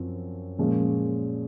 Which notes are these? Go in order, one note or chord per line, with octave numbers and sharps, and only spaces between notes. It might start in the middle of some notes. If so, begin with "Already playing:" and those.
Already playing: F#2 F3 C4
A#2 F3 G#3 C#4